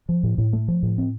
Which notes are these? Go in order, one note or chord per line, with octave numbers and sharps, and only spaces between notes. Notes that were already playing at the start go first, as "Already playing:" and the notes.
F3
A2
A2
A3
F3
A2
C4